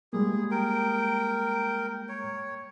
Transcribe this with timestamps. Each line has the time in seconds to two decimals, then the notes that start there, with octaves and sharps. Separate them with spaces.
0.13 G3 G#3 A#3 G#4
0.51 A#4 G5
2.09 C#5